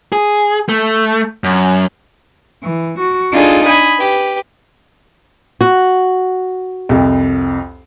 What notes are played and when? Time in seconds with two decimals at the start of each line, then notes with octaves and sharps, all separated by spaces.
0.12 G#4
0.69 A3
1.44 F#2
2.61 E3
2.98 F#4
3.31 D4 D#4 F4 G#4 A4
3.64 G#5 B5 D#6
3.99 G4 B4
5.61 F#4
6.89 C2 F2